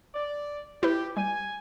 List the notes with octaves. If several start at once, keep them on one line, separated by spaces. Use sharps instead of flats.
D5
E4 G4 B4
G3 G#5